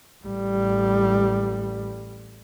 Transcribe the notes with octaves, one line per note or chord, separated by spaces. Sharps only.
A1 G3